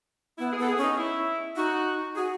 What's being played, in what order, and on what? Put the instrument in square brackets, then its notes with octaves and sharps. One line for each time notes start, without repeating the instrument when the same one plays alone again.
[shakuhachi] B3 [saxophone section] E4
[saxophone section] G#4
[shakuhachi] B3 [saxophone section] A4
[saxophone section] G#4
[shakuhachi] C#4
[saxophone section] D#4
E4
[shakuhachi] D#4 [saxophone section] F#4
[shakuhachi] F#4 [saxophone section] G#4